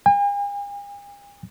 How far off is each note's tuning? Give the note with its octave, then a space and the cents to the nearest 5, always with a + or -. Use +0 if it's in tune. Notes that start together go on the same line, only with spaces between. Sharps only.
G#5 -45